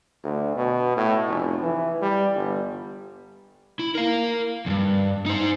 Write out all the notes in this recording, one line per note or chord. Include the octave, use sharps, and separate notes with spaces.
D2
B2
A2
F1
E3
G3
G1
E4
A#4 F5
E2 G2
D#4 C5